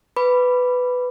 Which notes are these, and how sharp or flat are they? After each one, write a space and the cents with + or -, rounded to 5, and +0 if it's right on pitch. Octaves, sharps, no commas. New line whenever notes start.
B4 +10 B5 +0 D6 -15